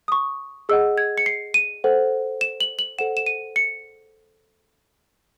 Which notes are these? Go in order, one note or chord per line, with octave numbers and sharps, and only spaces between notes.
D#6
C#6
G#4 D#5 F#5 E6
G#6
C#7
C7
D#7
A4 C5 F#5
E7
F#7
F#7
A4 C5 F#5 E7
E7
D#7
C#7